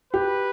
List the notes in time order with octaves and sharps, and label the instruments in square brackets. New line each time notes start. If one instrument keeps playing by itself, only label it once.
[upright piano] G4 [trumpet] B4